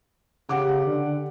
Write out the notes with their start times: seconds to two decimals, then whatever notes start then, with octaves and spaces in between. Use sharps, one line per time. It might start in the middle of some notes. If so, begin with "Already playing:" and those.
0.49 C#3 G4 F#5 D6
0.86 D3